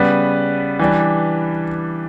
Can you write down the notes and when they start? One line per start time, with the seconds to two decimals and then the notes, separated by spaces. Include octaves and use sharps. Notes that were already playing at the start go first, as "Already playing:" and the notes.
Already playing: C#3 G3 B3 B4
0.79 E3 G3 D4